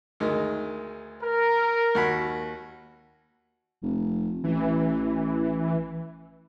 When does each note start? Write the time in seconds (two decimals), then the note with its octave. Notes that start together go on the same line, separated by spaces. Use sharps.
0.20 D2 D#3 G#3
1.23 A#4
1.95 D#2 F#4 B5
3.82 F1
4.44 A1 E3